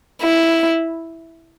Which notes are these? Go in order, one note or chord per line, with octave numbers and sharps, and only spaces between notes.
E4